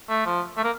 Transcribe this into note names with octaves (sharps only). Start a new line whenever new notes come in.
A3
F3
A3
A#3